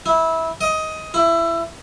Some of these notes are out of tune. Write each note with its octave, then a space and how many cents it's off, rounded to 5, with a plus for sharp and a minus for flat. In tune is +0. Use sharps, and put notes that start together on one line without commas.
E4 -20
D#5 +15
E4 +20